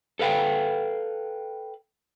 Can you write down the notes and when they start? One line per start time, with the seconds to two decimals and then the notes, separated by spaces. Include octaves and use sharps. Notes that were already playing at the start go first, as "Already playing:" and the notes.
0.19 A4 B4 F5 G5